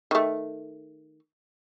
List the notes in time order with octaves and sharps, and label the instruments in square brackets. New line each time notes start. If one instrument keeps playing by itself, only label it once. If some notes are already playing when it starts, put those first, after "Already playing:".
[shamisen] D#3 A3